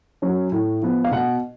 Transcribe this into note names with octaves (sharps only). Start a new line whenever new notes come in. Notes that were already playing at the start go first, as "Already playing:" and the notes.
F#3 C#4
A2
F3 B3
F5
B2 F#5